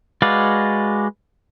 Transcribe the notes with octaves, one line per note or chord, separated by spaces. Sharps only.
G#3 F#4 B4 D5 F5